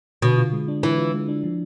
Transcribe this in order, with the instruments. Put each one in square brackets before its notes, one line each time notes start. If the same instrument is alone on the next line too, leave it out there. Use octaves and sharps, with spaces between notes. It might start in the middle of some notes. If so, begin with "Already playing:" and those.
[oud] B2 [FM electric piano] D3
[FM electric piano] F4
G#3
D4
[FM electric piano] D3 [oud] E3
[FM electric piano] F4
G#3
D4
F3